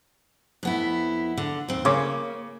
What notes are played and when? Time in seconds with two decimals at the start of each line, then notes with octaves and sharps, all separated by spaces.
0.63 F2 B3 E4
1.37 D3
1.68 D#2 C4
1.85 C#3 A#3 C#5 D6